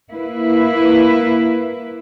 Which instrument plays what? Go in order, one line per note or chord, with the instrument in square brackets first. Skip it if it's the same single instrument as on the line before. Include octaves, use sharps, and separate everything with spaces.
[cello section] A#3 E4 B4